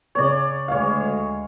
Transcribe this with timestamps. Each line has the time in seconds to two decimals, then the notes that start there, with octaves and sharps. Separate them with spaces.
0.15 C#3 C#5 D5
0.68 D2 G#3 C#5 F5